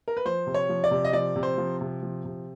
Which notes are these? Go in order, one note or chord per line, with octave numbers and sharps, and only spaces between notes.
A#4
B4
F3 C5
C3
C#5
F3
D5
C3
D#5
F3 D5
C3
C5
F3
C3
F3
C3